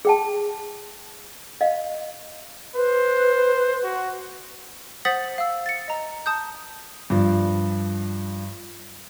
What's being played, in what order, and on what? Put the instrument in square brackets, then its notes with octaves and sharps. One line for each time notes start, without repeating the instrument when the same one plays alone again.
[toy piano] G#4 G5 A5
D#5 F5
[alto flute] B4 [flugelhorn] C5
[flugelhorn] F#4
[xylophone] C5 F#5 D#6 A6 B6 F#7
F5 E6
A6 C#7
D#5 A#5
A5 D#6 G6
[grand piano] G2 F3